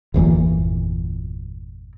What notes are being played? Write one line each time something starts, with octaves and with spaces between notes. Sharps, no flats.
G1 E2 A#2 E3